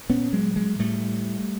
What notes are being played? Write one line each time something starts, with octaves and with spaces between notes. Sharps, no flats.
A#2 B3 C#4
F#3 G#3
F#3 G#3
A2 G3 A3